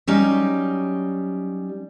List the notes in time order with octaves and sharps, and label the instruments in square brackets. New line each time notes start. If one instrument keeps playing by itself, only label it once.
[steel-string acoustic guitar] F#3 G3 C#4 D#4